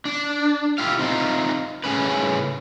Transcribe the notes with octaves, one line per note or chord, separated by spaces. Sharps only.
D4
E4 F4 G4 F5
C4 D#4 F4
A2 C#3 C#4 B4